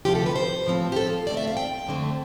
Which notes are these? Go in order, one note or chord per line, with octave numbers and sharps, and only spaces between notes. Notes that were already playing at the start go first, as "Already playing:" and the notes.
D2 C3 F3 G4
A4
B4
C5
A2 F3 C4
G4
A4
F4
D2 D3 A3 C4 D5
E5
F5
G5
F2 D3 A3 C4